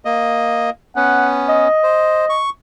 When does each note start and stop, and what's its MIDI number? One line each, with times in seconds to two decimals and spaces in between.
0.05 0.70 58
0.05 0.70 75
0.96 1.68 59
0.96 1.68 61
0.96 1.28 78
1.49 2.40 75
1.83 2.25 72
2.30 2.50 85